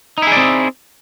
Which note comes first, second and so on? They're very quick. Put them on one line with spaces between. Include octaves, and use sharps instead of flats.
D#4 E4 G#4 D5 C4